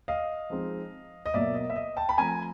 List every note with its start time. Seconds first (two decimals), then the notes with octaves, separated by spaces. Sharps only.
0.08 D#5 F5
0.50 F3 G#3 C4 D#4
1.26 D#5
1.34 B2 F#3 A#3 D5 E5
1.55 D#5
1.70 E5
1.76 D#5
1.96 G5 A5
2.09 B5
2.18 F3 A3 C4 G#5 A#5